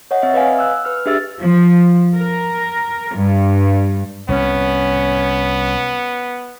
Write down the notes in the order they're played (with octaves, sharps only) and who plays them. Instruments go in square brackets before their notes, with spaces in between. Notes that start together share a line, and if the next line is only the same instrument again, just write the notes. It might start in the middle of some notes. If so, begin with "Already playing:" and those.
[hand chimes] C#5 D#5 F#5
C4 E5
B4 D#5 F5 G#5
E6 F#6
B4 F6
D4 G4 G#4 E5 E6 A6
[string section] F3
A#4
G2
[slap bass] C2 [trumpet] B3 [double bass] C#4